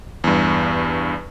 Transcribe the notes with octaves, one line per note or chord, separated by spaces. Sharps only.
E2 G2